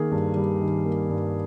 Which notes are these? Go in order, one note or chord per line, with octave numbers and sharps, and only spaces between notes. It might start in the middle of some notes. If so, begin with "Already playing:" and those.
Already playing: D#3 A#3 G#4
G2
G3
D#3
A#3
G2